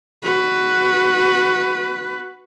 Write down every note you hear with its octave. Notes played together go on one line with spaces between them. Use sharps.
F#4 B4